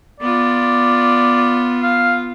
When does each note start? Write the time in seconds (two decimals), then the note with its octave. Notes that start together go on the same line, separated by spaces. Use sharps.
0.20 B3 F4 D5
1.82 F5